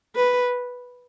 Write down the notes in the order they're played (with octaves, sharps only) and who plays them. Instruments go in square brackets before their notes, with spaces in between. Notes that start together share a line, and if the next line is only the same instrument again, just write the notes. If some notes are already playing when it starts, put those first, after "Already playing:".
[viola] B4